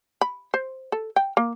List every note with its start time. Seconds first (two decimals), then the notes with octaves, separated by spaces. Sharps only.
0.21 B5
0.54 C5
0.92 A4
1.16 G5
1.37 A#3